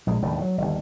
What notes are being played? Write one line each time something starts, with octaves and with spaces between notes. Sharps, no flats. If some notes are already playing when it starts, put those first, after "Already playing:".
A#1 G#3
E1 D#2 A2
E3 F#3
G1 D#2